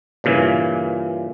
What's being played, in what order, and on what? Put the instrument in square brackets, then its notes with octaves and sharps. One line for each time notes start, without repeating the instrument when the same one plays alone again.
[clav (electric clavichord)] G2 A#2 C#3 E3